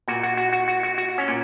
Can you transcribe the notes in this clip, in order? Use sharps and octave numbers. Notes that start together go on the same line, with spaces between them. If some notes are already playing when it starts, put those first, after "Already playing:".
A#2 F#4
F#4
F#4
F#4
F#4
F#4
F#4
C#4
A#2